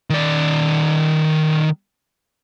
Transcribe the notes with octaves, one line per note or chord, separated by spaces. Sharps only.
D#3 D5